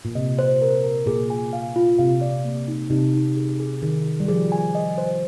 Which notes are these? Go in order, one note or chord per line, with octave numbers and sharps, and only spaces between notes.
A#2
C3 D#5
C5
A#4
A#4
A#2 G#4
G#5
F5
F4
C3 F5
D5
A#3
D#4
C3 D#4
D#4
G#4
G#4
D#3 G#4
G#4
G3
F3 G#4
G#5
D#5
C5